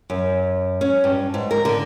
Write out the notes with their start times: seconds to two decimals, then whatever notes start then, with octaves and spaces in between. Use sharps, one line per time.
0.10 F#2
0.81 C#4
1.04 G2
1.34 G#2
1.51 A#4
1.65 D3